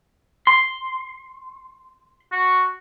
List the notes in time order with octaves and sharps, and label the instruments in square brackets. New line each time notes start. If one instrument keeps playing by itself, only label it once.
[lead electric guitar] C6
[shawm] F#4